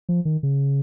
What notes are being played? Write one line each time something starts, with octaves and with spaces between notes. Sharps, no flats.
F3
D#3
C#3